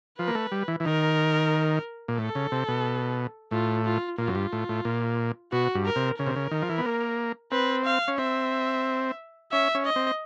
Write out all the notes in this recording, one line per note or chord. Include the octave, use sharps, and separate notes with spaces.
F3 B4
A#3
A3
G3
E3
E3
D#3 A#4
A#2
A2 A4
C#3
C3
B2
A2 F4
F4
A#2 F4
F#2
G2
A2
A2
A#2
B2 F#4
G2
A#4
C3
C#3 A#4
C3
C#3
D#3
F3
E3
B3
A#3
C4 B4
F5
C#4
C4 E5
C#4 E5
C#4
D#5
C4